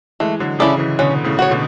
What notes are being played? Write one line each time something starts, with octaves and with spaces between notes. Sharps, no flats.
E3 G#3 A3
D3 F#3
C#3 E3 C#4 E4 A4 D5
C#3 E3
B2 D3 C#4
A2 C#3
F#4 C#5
B2 D3